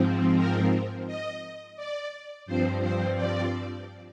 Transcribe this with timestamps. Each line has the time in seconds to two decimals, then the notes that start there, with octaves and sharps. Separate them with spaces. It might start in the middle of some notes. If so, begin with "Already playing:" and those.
Already playing: G#2 F3 C4
0.37 A#4
1.07 D#5
1.76 D5
2.46 G2 F3 C4 C5
2.81 C5
3.16 D5